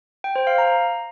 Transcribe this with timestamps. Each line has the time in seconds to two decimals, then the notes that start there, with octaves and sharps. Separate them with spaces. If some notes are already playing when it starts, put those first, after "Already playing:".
0.24 G5
0.36 C5
0.47 F5
0.58 A#5